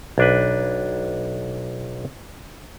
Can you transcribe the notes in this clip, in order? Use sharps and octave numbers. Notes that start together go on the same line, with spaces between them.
B1 D4 B4